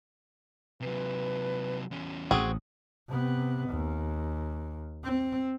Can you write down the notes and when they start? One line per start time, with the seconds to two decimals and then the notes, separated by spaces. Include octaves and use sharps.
0.81 C3 F#3 B4
1.91 E2 C#4
2.31 A1 A2 C4 F#4 G#4 D#6
3.09 C3 B3
3.70 D#2
5.04 C4